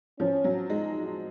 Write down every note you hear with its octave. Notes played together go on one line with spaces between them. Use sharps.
F3 C#4
F#3
G#3 D#4